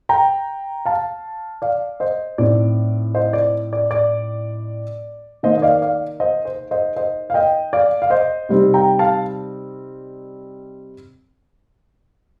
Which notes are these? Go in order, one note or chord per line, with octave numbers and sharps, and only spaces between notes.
G5 A#5
F5 A5
D5 F5
C5 D#5
A2 A3 C4 D#4 D5
C5 D#5
D5
D5
D5
D#3 A#3 D#4 C5 D#5
D#5
D5 F5
D5 F5
C5 D#5
C5
C5 D#5
C5 D#5
F5
D#5 G5
D5 F5
F5
C5 D#5
C3 G3 C4 D#4
G5 A#5
F5 A5